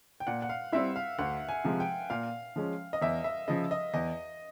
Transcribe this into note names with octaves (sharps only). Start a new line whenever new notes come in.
G5
A#2 F#5
F#5
F5
G3 C4 E4 E5
F5
D2 F#5
G#5
C3 F3 G#3
G5
A#2 F5
F3 G#3 C#4
D#5
E2 E5
E5
C#3 F3 D#5
D#5
E2 D#5